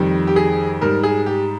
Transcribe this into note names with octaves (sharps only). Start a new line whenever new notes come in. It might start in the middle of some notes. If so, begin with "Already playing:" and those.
Already playing: F2 D#3 G3
G4
G#4
G#2 G3 A#4
G#4
G4